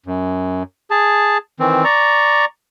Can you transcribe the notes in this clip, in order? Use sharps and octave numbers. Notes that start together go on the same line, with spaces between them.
F#2
G#4 A5
D#3 E3 C4
D5 A#5 C#6